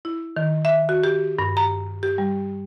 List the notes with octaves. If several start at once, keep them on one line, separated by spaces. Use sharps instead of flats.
E4
D#3
E5
F#4
G4
G2
A#5
G4
G3